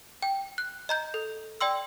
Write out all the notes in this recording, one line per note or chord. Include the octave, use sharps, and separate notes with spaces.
G5
F#6
D#5 A#5 G6
A4
D5 G5 C6 E6